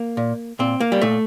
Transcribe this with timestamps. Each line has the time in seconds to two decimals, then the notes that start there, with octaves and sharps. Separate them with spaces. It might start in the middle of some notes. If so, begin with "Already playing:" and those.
Already playing: A#3
0.17 A#2
0.59 A#2 C4
0.80 A#3
0.92 G3
1.01 A#2 A3